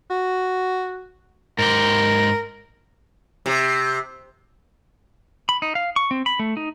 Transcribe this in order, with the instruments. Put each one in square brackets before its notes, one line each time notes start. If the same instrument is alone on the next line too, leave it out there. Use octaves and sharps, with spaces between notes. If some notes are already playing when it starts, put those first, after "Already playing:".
[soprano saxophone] F#4
[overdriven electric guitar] G#2 G4 [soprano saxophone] A#4
[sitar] C3
[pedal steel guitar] B5
D#4
F5
C#6
C4
B5
A3
D#4